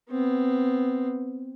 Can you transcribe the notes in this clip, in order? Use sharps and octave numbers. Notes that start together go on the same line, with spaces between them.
B3 C4